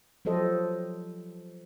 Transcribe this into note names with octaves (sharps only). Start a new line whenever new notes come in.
F3 F#3 G4 A4 C5 D#5